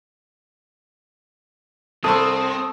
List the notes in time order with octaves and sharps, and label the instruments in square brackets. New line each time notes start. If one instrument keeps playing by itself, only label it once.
[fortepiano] C2 C6 [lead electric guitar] C4 [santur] A4 E5 C#6 [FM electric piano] D#6